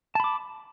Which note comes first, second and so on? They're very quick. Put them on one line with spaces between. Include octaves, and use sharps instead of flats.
A5 B5 D6